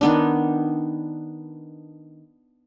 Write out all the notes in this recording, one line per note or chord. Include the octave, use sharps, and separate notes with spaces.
D#3 B3 D4